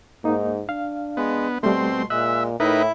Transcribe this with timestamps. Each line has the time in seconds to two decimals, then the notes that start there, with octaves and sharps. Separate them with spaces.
0.24 G#2 A#3 D#4
0.69 D4 F5
1.17 G#3 B3
1.63 B2 G3 A3 C4 C6
2.10 A#2 G#3 D#5 E5 F#6
2.60 A2 D#4 E4 A#4 B4 E5